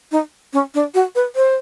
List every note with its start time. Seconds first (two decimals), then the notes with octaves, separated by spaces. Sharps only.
0.12 D#4
0.53 C#4
0.74 D4
0.94 F#4
1.15 B4
1.36 C5